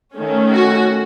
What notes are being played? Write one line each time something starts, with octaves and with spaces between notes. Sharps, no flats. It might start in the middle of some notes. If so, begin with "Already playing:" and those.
D#3 A3 C#4
F#4